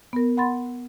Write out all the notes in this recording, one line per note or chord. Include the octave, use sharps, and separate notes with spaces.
B3 A#4
F#5 B5 C6 A6